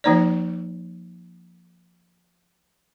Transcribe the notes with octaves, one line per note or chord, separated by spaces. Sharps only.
F3 A#3 D#4 C5 D5